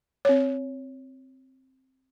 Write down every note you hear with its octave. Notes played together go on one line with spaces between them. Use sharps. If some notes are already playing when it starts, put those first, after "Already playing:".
C4 C#5